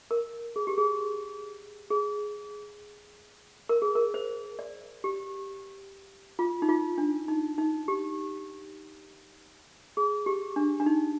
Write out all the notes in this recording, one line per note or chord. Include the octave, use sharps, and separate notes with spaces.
A#4
G#4
G4
G#4
G#4
A#4
G#4
A#4
C5
D5
G4
F4
D#4
F4
D4
D#4
D#4
G4
G#4
G4
D4
D4
D#4